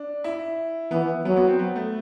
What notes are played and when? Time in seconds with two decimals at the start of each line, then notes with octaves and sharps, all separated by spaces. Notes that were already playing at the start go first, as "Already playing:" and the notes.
Already playing: D4
0.24 E4
0.91 E3 B3
1.25 F#3 B3
1.37 B3
1.47 C4
1.59 B3
1.76 A3